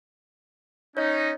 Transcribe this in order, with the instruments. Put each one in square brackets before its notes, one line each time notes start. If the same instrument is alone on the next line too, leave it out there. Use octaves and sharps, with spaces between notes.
[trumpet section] C#4 D#4 [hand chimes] C#5 D#5